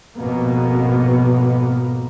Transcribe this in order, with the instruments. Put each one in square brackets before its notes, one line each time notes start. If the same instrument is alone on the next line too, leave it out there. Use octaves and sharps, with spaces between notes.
[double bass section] G#1 F2 B2 A#3 B3